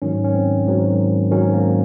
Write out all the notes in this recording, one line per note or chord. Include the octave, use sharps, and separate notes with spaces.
G#2 D#3 F#3 C#4
C#4
C4
G#2 D#3 F#3
G#2 D#3 F#3 C#4
A#3